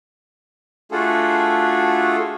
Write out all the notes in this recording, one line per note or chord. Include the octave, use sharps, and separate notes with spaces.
A3 D4 F4 F#4 G#4 A4